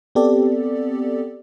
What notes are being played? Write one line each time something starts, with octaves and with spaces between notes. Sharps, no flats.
B3 C4 G4 A4 D5